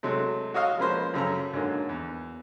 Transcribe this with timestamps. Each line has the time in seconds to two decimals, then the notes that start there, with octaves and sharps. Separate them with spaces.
0.03 C3 F#3 G#3 A3
0.54 F#4 C#5 D#5 F5
0.78 F3 G#3 A#3 C#4 B4 C5
1.14 F#2 C#3 A4 A#5
1.53 G#2 D3 F#3 A#3
1.89 E2